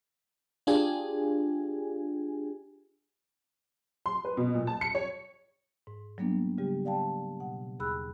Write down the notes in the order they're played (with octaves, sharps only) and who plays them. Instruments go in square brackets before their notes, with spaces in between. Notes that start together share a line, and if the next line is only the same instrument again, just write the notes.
[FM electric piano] D4 F4 G4 G#4 G#5
[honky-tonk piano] C6
B4
B2
A#2
A5
C#7
C#5
[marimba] G#2
F#3 G3 A#3 B3 D4
C#3 G3 G4
D5 F5 G5 A5
B2 F#5
D#2 G#4 B5 E6 F#6